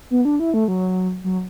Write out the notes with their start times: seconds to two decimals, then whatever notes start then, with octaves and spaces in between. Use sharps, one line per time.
0.11 B3
0.25 D4
0.40 E4
0.54 A3
0.68 F#3
1.24 F#3